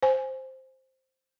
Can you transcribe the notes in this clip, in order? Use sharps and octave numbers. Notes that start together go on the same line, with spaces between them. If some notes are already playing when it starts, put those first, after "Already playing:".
C5 G#5